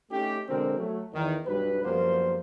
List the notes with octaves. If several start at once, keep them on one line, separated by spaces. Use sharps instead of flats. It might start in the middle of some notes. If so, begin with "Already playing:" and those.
A3 C#4 D#4 G4
B2 D3 F#3 G#3 C4 A#4
F#3 A3
E2 D#3
B1 G2 F#3 B4
F#2 F3 G3 A#3 B3 C5